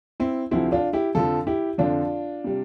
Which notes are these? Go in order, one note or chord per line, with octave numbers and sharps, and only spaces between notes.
C4 E4
D2 C3 F3 C4 E4
D4 F4
E4 G4
F2 D3 F3 F4 A4
E4 G4
F2 D3 F3 D4 F4
C3 G3